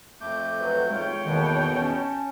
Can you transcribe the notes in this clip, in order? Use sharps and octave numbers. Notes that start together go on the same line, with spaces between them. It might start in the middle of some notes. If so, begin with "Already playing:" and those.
F2 A3 D6 G6
F#3 B4
G#3 F4 C#5 G5
E2 B2 D#3 A#3 A4 B4
C#4 A5